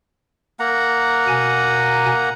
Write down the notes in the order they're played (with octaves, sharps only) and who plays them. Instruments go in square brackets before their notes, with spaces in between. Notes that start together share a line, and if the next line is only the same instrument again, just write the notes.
[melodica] A#3 F#5 A#5
[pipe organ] B2 G#5